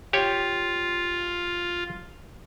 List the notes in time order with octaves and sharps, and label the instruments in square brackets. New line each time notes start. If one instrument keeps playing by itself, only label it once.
[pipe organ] F4 [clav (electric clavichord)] G4 C#5